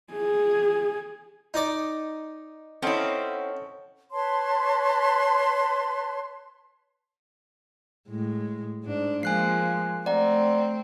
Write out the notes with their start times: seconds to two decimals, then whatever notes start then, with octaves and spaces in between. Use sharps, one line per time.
0.14 G#4
1.54 D#4 D5
2.82 C4 C#4 E4 A4 C#5 D#5 F#5
4.12 B4 C#5 A5 C6
8.09 A2 G#3
8.84 G#2 D4
9.23 F3 G#3 A#3 G#5 F#6 C7
10.06 A3 C4 D5 F#5 A#5